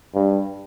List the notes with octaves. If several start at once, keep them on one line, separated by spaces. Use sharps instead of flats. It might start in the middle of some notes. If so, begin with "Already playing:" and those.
G2